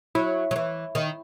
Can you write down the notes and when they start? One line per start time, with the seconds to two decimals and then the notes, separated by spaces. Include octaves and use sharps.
0.15 F#3 E4
0.51 F#3
0.56 E3
0.95 D#3